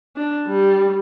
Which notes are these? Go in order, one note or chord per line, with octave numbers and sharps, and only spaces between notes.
D4
G3